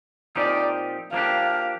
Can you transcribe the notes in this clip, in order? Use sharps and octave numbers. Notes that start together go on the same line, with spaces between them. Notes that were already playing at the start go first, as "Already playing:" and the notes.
A#2 F3 C4 D#4 G4 D5
F3 A#3 D4 G4 F5